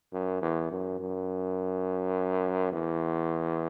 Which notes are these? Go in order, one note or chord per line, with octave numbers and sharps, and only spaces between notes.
F#2
E2
F#2
F#2
E2